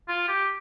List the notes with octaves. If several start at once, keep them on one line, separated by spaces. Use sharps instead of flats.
F4
G4